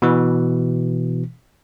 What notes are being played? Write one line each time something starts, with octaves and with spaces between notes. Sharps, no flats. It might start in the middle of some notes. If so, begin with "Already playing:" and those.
B2 E3